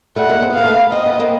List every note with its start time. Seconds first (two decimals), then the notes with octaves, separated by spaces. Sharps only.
0.16 G3 A3 F#5
0.29 G#3 A#3
0.42 C4
0.50 B3
0.54 A#3 F5
0.64 A3 B3
0.92 C4 D#5
1.06 B3
1.19 A#3 C4